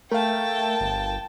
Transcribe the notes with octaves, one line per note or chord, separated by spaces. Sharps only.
A3 A#4 F5 G5 A5
G1